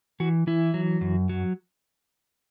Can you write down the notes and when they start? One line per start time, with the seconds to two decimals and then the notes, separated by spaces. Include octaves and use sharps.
0.20 E3 F#4
0.47 E3 E4
0.74 F#3
1.01 F#2
1.29 F#3